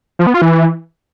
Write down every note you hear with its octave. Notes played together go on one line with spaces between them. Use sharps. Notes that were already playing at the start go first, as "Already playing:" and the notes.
F3
B3
F4
E3